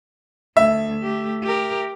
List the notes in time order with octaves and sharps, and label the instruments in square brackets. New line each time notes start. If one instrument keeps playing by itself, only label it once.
[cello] D2 [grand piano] E5
[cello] A3 G4
G4 A#4